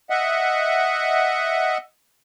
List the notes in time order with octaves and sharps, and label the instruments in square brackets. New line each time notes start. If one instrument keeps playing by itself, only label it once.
[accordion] D#5 E5 F#5